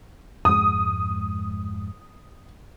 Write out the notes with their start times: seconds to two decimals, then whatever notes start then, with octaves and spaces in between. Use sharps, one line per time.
0.45 F2 G#2 G#3 D#6